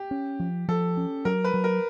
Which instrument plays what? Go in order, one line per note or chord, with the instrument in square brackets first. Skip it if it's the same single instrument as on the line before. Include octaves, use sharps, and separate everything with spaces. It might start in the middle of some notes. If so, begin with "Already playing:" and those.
Already playing: [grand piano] G4
[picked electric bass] C#4
F3
[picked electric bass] F3 [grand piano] A4
[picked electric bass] C#4
[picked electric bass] F#3 [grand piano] A#4
[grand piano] B4
[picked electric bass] F#3
[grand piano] A#4